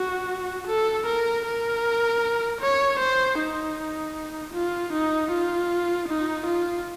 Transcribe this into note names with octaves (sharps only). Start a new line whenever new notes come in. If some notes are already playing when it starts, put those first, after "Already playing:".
Already playing: F#4
A4
A#4
A#4
C#5
C5
D#4
F4
D#4
F4
D#4
F4